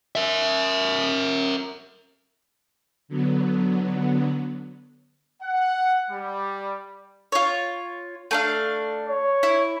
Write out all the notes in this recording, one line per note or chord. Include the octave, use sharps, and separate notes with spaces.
A#4 E5
D3 F#3 B3
F#5
G3
F4 C#5
A3 D4 F5
C#5
E4